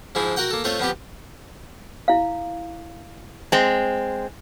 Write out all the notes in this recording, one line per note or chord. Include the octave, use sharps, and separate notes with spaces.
G#2 F3 G#3 E4
F#4 A#4 F#5 G5
A#3 A4
A3 C4 F4 C#5
F3 B3 C4 G4
E4 F5
G#3 C4